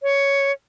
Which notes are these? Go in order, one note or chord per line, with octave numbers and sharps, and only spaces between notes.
C#5